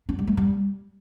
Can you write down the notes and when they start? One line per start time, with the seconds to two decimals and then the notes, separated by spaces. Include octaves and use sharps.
0.09 D4
0.19 G3
0.27 A3
0.37 G3